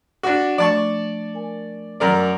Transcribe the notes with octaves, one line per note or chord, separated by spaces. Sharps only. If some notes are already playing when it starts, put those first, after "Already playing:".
D4 F#4 D6
F3 A3 D4 D5 A5 C#6
A#4 G#5
F#2 D#3 A#4 D5